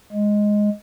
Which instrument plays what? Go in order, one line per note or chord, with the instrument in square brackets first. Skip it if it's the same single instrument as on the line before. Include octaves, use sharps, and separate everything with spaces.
[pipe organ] G#3